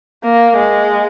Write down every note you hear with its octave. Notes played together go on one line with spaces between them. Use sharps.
A#3
G#3